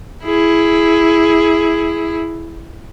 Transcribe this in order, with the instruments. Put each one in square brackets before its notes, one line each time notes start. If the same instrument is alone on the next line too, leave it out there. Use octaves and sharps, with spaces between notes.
[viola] E4 G#4